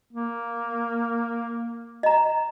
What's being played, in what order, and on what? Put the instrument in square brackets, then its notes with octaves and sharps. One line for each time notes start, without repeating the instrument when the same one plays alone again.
[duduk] A#3
[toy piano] D#5 A#5